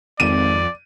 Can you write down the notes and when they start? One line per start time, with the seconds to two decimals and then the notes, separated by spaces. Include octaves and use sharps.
0.20 G#1 F2 D5 D#7